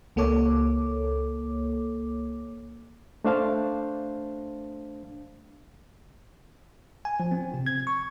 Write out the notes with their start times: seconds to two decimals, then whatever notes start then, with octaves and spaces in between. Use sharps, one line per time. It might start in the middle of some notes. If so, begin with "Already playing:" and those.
0.16 C#2 A#3 A4 C#5 D6
3.24 A3 D4 C5 F5 A5
7.05 G#5
7.20 F3
7.31 C4
7.54 C3
7.66 G#6
7.87 C#6